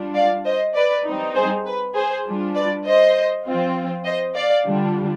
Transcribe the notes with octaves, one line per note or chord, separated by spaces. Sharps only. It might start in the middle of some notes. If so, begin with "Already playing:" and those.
Already playing: G3 D4 F4
D5 F5
C5 D#5
B4 D5
G3 C4 D#4
G#4 C5
B4
G#4 C5
G3 D4 F4
B4 D5
C5 D#5
F3 C4 F4
C5 D#5
D5 F5
D3 G3 D4 F4